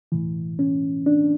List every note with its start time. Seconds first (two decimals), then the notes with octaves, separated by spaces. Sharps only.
0.12 A2 E3
0.59 C#4
1.06 D4